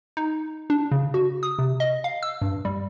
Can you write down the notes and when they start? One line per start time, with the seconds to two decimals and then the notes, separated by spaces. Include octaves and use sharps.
0.17 D#4
0.70 D4
0.91 C#3
1.14 F#4
1.43 D#6
1.59 C3
1.80 D#5
2.04 F5
2.23 E6
2.42 G2
2.65 G3